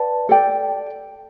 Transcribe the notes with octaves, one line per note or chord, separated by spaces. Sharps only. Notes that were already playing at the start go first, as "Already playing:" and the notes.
Already playing: B4 D5 F#5 A5
A4 D5 G5